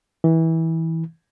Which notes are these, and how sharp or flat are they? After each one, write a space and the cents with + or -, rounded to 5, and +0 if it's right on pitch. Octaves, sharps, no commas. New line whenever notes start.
E3 -20